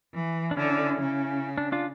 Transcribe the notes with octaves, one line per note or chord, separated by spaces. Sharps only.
E3
D4
D3 C#4 E4
C#3
D4
D4 F4